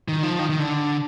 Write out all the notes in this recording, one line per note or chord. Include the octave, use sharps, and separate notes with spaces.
D#3
F3
D#3
D#3
D3